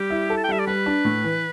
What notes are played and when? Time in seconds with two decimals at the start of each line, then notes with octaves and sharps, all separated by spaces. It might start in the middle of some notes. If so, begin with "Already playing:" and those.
Already playing: G3 G4
0.10 E4
0.30 A4
0.37 A5
0.44 G5
0.49 G3 E5
0.59 D5
0.67 G3 B4
0.86 D4
1.05 A2
1.24 E3